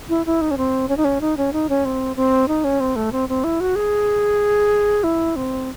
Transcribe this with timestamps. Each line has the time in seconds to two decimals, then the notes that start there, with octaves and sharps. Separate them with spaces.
0.09 E4
0.26 E4
0.41 D#4
0.51 C#4
0.58 C4
0.89 C#4
0.97 D#4
1.05 C#4
1.21 D#4
1.37 C#4
1.53 D#4
1.69 C#4
1.85 C4
2.16 C4
2.48 D#4
2.64 C#4
2.80 C4
2.96 A3
3.12 C4
3.29 C4
3.44 E4
3.60 F#4
3.76 G#4
5.04 E4
5.36 C4